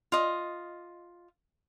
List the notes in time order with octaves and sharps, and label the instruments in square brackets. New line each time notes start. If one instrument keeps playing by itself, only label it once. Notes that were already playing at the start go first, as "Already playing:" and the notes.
[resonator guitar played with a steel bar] F4 D#5